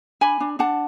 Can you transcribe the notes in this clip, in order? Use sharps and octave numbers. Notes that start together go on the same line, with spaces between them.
D4 G#5 B5
D4
D4 F#5 A5